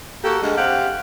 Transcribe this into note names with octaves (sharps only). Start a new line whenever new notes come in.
A#3 F#4 G4 A4
D2 G#3
C3 G4 F5 F#5